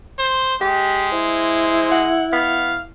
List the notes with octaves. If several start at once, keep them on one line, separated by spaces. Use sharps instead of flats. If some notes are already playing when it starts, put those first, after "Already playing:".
C5
G#3 G4
E4 C5
F#5
B3 F5